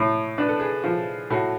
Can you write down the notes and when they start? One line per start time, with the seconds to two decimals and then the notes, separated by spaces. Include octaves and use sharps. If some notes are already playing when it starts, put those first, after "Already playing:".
Already playing: A2
0.38 D4 B4
0.49 A4
0.59 G#4 B4
0.84 F3
1.30 A2 F#4 A4